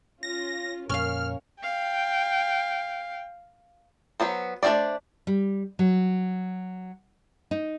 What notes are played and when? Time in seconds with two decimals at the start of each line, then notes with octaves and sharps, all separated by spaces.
0.23 C#4 F4 A#6
0.89 F2 A#2 C#4 A#4 C#5 F5 F6
1.63 F5 G5
4.20 F#3 B3 C5
4.63 A3 D4 A4 C5 D5
5.27 G3
5.79 F#3
7.51 D#4